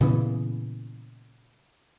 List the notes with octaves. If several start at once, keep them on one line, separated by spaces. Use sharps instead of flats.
A#2 C#3 E3 B3